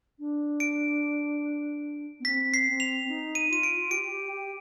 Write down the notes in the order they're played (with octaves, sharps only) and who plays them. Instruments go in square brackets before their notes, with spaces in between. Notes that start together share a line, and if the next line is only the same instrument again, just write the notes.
[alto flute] D4
[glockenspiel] D7
[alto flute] B3
[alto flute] C4 [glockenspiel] B6
[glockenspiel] C7
[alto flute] C4
[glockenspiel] F7
[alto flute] D#4
[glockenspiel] D#7
[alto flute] F4 [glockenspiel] D#7
[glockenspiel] D7
[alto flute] F4
[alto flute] G4 [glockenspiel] D7
[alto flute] G4
G4